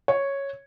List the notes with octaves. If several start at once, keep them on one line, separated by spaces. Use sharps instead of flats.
C#5